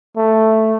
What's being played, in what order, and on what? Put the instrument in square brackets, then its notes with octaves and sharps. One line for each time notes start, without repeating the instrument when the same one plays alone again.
[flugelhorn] A3